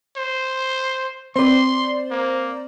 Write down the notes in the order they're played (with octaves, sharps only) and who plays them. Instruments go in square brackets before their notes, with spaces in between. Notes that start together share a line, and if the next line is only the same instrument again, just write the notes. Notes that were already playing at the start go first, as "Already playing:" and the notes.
[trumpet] C5
[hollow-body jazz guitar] C4 B4 [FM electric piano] C5 D5 [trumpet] C6
[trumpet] A#3